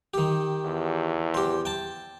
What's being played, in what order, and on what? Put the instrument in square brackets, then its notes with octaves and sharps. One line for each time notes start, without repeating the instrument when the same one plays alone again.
[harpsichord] D#3 G4
[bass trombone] E2
[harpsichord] G4 C5
G5 A5